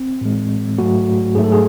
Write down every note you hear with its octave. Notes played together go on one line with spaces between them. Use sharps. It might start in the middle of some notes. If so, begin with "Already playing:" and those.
Already playing: C4
A2 E3 G#3
G#2 F#3 A3 F#4
G#2 F#3 A3 G#4
A4
G#4